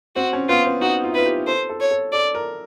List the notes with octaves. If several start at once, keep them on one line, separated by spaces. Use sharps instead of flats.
C4 F#4
C#4
B3 F4
C4
D#4 F#4
F4
E4
F4 B4
G4
A4 C5
A4
C#5
A4
A4 D5
A#4